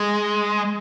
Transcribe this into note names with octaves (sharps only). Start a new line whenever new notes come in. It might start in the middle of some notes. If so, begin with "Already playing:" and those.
Already playing: G#3